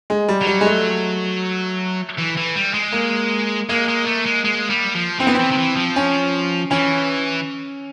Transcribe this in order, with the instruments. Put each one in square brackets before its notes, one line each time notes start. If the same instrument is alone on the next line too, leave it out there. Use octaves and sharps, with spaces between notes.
[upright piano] G#3
G3
[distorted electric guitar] F#3
[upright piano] G3
G#3
A3
[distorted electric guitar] E3
E3
G3
G#3
[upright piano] A#3
[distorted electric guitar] G#3 [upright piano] A#3
[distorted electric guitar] G#3
A3
G#3
G#3
G3
F3
[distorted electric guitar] E3 [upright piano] C4
[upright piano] B3
[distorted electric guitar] E3 [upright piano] C4
[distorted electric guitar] D#3
E3
F3
[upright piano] C#4
[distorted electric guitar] E3 [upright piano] C#4